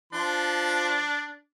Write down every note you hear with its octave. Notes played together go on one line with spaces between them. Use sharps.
F3 D4 C6